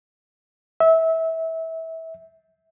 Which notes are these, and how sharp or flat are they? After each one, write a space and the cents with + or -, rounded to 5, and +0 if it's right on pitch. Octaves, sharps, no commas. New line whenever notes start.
E5 -25